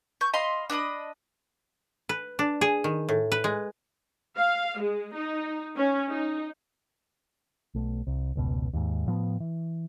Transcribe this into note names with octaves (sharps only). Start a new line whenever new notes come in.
C#6 G6
D#5 F5 B5 C6
D4 D#5 B5 D#6
B4
D4
G#4
D#3
A2
B4
G#3
F5
G#3
D#4
C#4
D#4
B1 A3
C2
F1 C#2 B2
D#2 G#2
A2 F3 A3 B3
E3